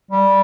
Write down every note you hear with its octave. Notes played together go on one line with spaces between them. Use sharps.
G3